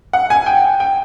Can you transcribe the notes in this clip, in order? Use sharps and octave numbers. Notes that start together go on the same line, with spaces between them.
F#5
G#5
G5
G5